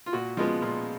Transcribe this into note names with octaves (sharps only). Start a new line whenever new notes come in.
F4
A#2 F#4
F3 G#3 B3 F4
A#2 F4